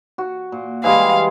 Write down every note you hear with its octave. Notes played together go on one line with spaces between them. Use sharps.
F#4
A#2
E3 G3 G#3 F5